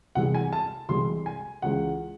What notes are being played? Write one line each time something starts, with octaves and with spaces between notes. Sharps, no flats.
C2 C3 E3 G#3 F#5
G#5
A5
C2 C3 E3 G#3 C6
G#5
C#2 C#3 E3 G#3 F#5